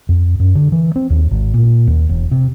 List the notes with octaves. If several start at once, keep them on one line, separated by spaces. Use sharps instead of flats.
F2
F#2
D3
E3
C4
D#2
G#1
A#2
D#2
E1
C3